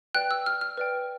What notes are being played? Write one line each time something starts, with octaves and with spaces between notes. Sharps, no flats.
B4 D5 G5 F#6
E6
F6
F6
B4 D5 G5